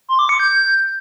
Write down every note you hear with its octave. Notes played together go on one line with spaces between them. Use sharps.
C6
D6
C#7
G6